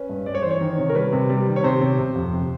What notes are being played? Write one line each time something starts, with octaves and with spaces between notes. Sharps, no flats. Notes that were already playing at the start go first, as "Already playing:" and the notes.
Already playing: C#4 B4
G2
G2 D5
C#5
E3 C5
C#5
D#3
C3
A#4
G3 B4
C3
G3
D#3
C#5
C3 C5
C3
C3
F2
C3